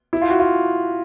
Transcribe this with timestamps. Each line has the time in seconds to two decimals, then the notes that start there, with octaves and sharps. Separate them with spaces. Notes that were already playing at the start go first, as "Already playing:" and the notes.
0.13 E4
0.22 F4
0.30 F#4
0.39 F4